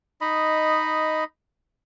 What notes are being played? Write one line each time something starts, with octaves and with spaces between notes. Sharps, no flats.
D#4 D#5 B5